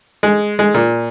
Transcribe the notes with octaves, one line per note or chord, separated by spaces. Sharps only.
G#3
G#3
A#2